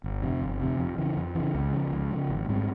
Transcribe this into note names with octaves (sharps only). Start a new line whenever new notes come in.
G1
F2 C3
G1
F2 C3
F2
C#3 E3
F2
C#3 E3
C#2
C#3 F3
C#2
C#3 F3
G#1
G#2 G3 C4